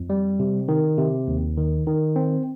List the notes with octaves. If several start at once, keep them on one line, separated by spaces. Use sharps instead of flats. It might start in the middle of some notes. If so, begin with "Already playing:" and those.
Already playing: F2
G3
C3
D#3
C3
D#2
D#3
D#3
C4